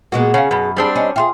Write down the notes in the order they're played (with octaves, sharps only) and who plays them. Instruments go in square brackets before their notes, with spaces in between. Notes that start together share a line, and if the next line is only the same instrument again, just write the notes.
[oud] A#2 G#3 B3 [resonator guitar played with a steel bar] F#4 [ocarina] G#4
[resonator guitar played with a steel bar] C#3 [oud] C#4 [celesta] F5 F#5
[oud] F#2 [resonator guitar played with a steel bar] B2 [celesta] F#5 B5
[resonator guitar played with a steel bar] G3 C4 D4 [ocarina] G#4
[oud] C#4 [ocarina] D#5
[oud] F4 F#4 G#4 [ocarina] E5 [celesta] G5 C6